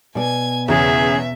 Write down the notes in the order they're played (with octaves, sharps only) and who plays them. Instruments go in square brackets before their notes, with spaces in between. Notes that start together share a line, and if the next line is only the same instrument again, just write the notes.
[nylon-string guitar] B2 D5 [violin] G#5 G#6
[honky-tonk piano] E2 C#3 C#4 [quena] G#4 [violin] E5